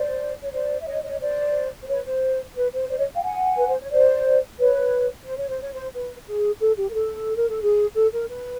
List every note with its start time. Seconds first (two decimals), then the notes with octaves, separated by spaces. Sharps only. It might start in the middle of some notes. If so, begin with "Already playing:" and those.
Already playing: C5 D5
0.43 C#5
0.53 C5 D5
0.81 E5
0.87 C#5 D#5
1.04 C#5 D#5
1.21 C5 D5
1.83 C5
1.88 B4 C#5
2.05 C5
2.56 B4
2.73 C5
2.89 C5 D5
2.98 C#5 D#5
3.15 F5 G5
3.23 F#5 G#5
3.56 B4
3.67 C5
3.79 C#5
3.90 C5 D5
4.58 B4 C#5
5.26 C5
5.38 C#5
5.48 C5
5.61 C#5
5.73 C5
5.94 B4
6.27 G#4
6.60 A4
6.77 G4
6.90 A#4
6.94 A4
7.36 A#4
7.49 A4
7.62 G#4
7.95 A4
8.13 A#4
8.30 B4